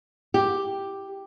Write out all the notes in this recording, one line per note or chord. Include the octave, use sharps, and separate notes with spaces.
G4